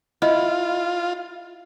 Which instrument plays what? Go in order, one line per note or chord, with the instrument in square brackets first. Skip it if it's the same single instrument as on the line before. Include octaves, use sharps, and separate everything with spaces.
[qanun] E4 [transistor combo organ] F4 [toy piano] D#5